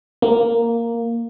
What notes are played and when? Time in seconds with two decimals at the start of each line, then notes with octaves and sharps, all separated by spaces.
0.22 A#3